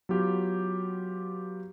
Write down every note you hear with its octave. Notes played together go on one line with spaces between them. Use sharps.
F#3 B3 F4 G4